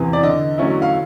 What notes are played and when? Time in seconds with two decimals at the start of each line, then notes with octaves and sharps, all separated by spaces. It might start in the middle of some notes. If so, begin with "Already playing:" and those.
Already playing: E2 C3 E3
0.13 D5
0.23 D3 D#5
0.58 F#3 A3 C#4 E4
0.82 F5